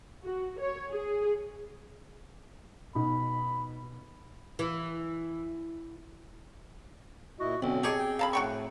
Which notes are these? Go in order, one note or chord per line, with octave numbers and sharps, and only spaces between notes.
F#4
C#5
G#4
B2 D#4 B5
E3
A#2 E4 F#4 D#5
B1 D3 C4 C#4
G4 G#4 C#5 D#5 A5
G5
F5 A5 B5
A2 F#4 G5 C#6